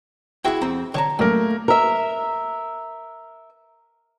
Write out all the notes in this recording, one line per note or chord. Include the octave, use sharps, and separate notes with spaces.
E4 F#4 G#4 G5 B5
F2 C4 A#5
D3 C#5 A5 A#5
F#2 A#2 A3 A#3 A#4
A#4 E5